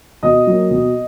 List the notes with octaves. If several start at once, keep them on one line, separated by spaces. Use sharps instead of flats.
B2 D#5 D#6
F#3 A#3
B2